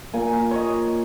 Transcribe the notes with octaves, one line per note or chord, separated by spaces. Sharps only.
A#2 A#3 G#5
C#5 D#5